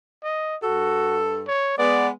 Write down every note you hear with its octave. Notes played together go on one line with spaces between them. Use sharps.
D#5
G2 F#4 A4
C#5
G#3 B3 D5